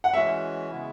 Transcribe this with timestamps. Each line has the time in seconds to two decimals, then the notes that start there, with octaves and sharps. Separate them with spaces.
0.04 F#5
0.14 E3 G#3 C#4 F#4 E5
0.70 C#3 G#3 B3 E4